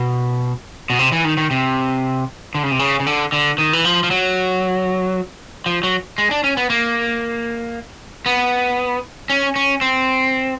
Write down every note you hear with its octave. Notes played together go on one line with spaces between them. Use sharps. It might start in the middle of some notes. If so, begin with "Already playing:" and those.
Already playing: B2
B2
C3
E3
D#3
D#3
C3
D3
C#3
C3
C#3
C#3
D3
D3
D#3
E3
F3
F3
F#3
F3
F#3
G#3
D4
C#4
B3
A#3
B3
C#4
C#4
C4